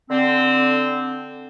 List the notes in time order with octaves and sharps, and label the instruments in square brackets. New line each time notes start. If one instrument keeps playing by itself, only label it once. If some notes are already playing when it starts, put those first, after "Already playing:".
[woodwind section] D3 C4